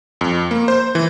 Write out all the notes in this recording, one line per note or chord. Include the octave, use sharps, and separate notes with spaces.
F2
A#3
C5
E3